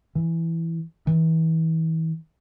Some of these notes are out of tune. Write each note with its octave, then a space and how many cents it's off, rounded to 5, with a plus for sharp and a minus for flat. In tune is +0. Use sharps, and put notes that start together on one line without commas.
E3 +5
E3 -35